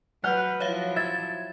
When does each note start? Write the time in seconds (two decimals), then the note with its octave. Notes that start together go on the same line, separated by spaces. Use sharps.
0.24 F#3 B4 F#5 F6 G6
0.60 F3 F#3 E4 C#5 E5 F5
0.96 E5 G#6 A6